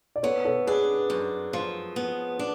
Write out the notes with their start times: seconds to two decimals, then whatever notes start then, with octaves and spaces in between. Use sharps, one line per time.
0.16 D5
0.23 B3 A4 C#5
0.45 A4 C#5
0.67 D4 G#4 B4
1.10 F#2
1.53 F3
1.96 B3
2.39 D4